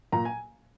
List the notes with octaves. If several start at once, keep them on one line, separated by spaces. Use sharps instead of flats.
A#2 A#5
G#5